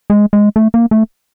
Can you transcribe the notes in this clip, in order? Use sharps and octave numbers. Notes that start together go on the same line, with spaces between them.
G#3
G#3
A3
A#3
A3